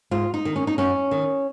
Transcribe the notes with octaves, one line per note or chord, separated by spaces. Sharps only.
G#2 F4
D#4
D#3
C#4
D#4
F#2 C#4
D#3